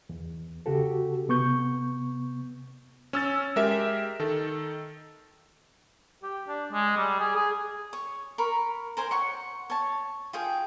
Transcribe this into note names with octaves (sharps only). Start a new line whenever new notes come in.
E2
C#3 F#4 G4 A4
C3 B3 C#6 G6
C#4 E6 A6
G#3 G4 A#4 E5
D#3 A4
G4
D4
G#3
G3
G#4
G#4
C#5
A#4 B5 C#6
A#4 C5 G#5 C6
C#5 F#5 C#6
C#5 A5
F4 G#4 G5